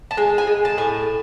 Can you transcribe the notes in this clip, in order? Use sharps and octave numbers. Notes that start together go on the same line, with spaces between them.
A5
G#3 G#5
G#5
G#3
A5
A2 G#5